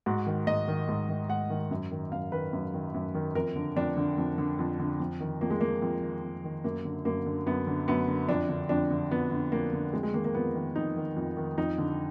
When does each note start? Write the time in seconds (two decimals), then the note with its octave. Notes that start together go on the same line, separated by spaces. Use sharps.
0.06 G#2 F#4
0.26 D#3
0.47 G#2 D#5
0.68 D#3
0.89 G#2
1.09 D#3
1.29 G#2 F#5
1.50 D#3
1.71 F#2
1.91 D#3
2.12 F#2 F5
2.32 D#3 B4
2.53 F#2
2.74 D#3
2.94 F#2
3.15 D#3
3.35 F2 A#4
3.56 D3
3.76 F2 D4
3.97 D3
4.18 F2
4.38 D3
4.59 F2
4.80 D3
5.00 F2
5.20 D#3
5.41 F2 A#3
5.50 G#3
5.61 D#3 A#3
5.82 F2
6.02 D#3
6.23 F2
6.44 D#3
6.64 F#2 A#3
6.85 D3
7.05 F#2 A#3
7.26 D3
7.46 F#2 B3
7.67 D3
7.88 F#2 B3
8.08 D3
8.29 F2 D4
8.49 D3
8.69 F2 D4
8.91 D3
9.11 F2 B3
9.31 D3
9.52 F2 A#3
9.73 D3
9.93 F2 G#3
10.03 G#3
10.14 D#3 A#3
10.25 A#3
10.34 F2 B3
10.55 D#3
10.76 F2 D#4
10.97 D#3
11.16 F2
11.37 D#3
11.58 F2 D#4
11.78 D3